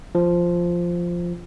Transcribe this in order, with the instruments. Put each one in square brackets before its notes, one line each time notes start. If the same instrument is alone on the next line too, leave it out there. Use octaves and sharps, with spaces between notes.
[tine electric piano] F3